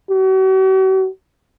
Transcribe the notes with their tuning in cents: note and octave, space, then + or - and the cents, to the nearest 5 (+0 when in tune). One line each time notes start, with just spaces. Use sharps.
F#4 +45